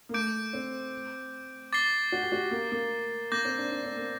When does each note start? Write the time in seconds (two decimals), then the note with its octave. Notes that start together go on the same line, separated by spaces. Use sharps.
0.09 A#3
0.13 A3 D6 G6 D7
0.53 C4
1.73 D6 A6 C7 G7
2.12 F#4
2.22 G4
2.32 F#4
2.51 A#3
2.72 A#3
3.32 A#3 D6 G6 A#6
3.45 C4
3.58 D4
3.71 D4
3.84 C4
3.97 A#3